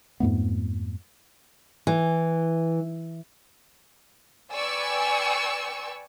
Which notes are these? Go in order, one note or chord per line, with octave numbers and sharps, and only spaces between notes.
F2 G#2 A3 B3
E3
B4 D5 G5 G#5 C#6 E6